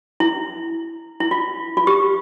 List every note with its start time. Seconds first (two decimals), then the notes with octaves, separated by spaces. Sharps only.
0.20 E4
1.20 E4
1.31 F4
1.77 F4
1.87 G4